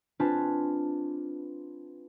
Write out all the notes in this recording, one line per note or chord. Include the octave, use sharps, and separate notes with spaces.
C4 D4 F4 B4 G#5 A5